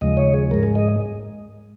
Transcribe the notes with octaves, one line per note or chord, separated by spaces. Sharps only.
D#2 C#3 F3 G#3 D#5
C#5
G#4
G#2 G#3 A#4
G#4
D#5